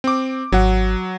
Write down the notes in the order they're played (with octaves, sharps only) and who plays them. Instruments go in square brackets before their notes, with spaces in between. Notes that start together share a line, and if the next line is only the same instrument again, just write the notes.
[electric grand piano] C4 D6
[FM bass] G#1 [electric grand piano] F#3 F#5